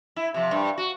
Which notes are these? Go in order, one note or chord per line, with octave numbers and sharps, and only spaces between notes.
E4
C3 F3
G2
F#4